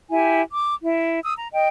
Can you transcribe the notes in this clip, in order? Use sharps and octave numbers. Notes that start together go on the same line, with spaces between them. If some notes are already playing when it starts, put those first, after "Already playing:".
E4 G4 G#5
D6
E4
D#6 E6
A#5
D#5 G5